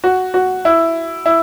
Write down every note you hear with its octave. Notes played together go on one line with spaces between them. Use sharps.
F#4
F#4
E4
E4